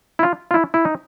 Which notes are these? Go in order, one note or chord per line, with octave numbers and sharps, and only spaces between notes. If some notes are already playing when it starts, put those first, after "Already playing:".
E4
F4
F4
E4
E4
D#4